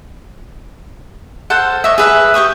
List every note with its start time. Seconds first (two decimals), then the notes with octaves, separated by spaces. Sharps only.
1.50 A4 C5 F5 F#5
1.84 C#5 D#5 E5
1.98 G#4 B4 E5
2.34 G4 G5 C#6 D#6